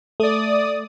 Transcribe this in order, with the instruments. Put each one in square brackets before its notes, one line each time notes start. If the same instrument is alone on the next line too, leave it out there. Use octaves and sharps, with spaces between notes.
[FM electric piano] A3 [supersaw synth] D5 D#6